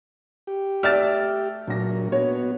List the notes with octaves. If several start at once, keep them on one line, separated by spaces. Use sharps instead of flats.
G4
A3 D5 E5 F6 A6
A#2 F#3 D4 A#6
B3 F#4 C#5